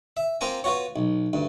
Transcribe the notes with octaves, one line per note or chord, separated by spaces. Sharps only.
E5
A#3 C4 F4 A#4 G5 G#5
B3 F4 F#4 C#5
B1
D2 G2